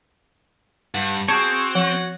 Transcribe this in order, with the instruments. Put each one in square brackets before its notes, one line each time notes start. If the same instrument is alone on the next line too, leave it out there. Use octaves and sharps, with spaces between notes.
[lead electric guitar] G2 [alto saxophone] F#5
[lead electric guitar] C4 [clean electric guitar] F#4 C#5 [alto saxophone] G#4 [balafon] A5
[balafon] F3 [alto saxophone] F#5